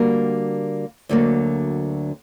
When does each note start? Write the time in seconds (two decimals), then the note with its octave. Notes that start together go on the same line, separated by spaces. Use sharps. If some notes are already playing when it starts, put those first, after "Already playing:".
Already playing: D3 G3 A#3 F#4 A#4
1.09 D2 D3 F#3 A#3